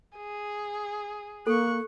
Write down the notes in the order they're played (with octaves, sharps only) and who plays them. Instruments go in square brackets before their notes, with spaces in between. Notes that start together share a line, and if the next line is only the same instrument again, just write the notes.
[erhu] G#4
[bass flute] A#3 [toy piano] A4 [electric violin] C#6 F#6